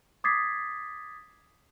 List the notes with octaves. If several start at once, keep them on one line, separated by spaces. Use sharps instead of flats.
D6 D#6 G#6 A6 B6 C7